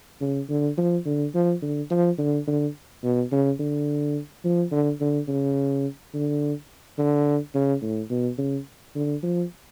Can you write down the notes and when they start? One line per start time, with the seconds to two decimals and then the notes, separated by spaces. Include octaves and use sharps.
0.21 C#3
0.49 D3
0.77 F3
1.06 D3
1.34 F3
1.62 D3
1.90 F3
2.18 D3
2.47 D3
3.03 B2
3.32 C#3
3.59 D3
4.44 F3
4.72 D3
5.01 D3
5.28 C#3
6.14 D3
6.98 D3
7.55 C#3
7.82 A2
8.10 B2
8.38 C#3
8.96 D3
9.23 F3